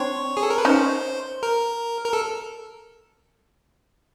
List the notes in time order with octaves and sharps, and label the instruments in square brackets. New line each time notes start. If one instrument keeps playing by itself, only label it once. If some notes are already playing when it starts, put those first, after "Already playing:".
Already playing: [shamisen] C4 D4 [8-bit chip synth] C#5
[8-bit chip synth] G#4
A4
A#4
B4
[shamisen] C#4 D#4 [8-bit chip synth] C5
[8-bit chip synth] A#4
A#4
A4